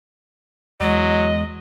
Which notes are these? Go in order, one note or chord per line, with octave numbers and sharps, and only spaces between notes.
E2 F#3 G#3 D#5